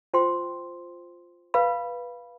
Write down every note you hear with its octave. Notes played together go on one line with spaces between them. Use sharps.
F4 C5 G5 C6
B4 F5 B5